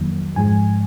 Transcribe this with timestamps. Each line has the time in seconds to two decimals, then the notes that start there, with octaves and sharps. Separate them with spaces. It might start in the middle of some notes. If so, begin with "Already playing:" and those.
Already playing: F2 D#3 F#3 A#3
0.36 G#2 F3 G#3 G#5